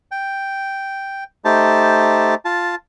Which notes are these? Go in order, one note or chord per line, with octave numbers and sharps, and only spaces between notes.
G5
A3 D#4 G4 C5 A5
F4 A5